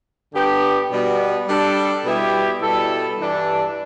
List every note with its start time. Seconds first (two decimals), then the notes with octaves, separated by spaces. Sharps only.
0.34 G2 D3 B3 G4
0.90 B2 G3 B3
1.47 G3 D4 A4
2.05 B2 G3 B3 E4 G4
2.62 B2 G3 E4 A4
3.19 G2 E3 G3 D4